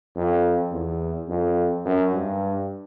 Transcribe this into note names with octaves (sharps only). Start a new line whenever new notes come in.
F2
E2
F2
F#2
G2